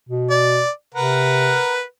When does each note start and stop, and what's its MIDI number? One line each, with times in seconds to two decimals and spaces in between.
0.09 0.63 47
0.30 0.70 74
0.95 1.59 48
0.95 1.83 70
0.95 1.83 71
0.95 1.83 78